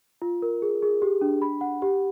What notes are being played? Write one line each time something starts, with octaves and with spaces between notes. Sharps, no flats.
F4
A#4
G#4
G#4
G4
D4
B5
F#5
G4